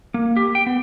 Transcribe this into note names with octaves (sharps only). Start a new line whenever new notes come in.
A#3
G4
G5
B3